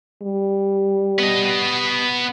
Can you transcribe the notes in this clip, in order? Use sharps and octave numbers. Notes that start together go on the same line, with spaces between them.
G3
B3 D#5